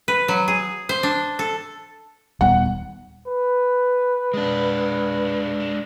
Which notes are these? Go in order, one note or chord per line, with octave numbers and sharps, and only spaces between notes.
B4
F#3
G#4
C5
D4
A4
D#1 G3 B3 F#5
B4
G#3 D4